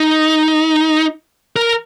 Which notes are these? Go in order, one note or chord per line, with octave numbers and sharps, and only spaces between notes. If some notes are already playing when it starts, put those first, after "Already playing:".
Already playing: D#4
A#4